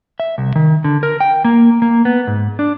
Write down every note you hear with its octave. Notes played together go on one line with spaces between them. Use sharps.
E5
C2
D#3
D3
A#4
G5
A#3
A#3
B3
G#2
D4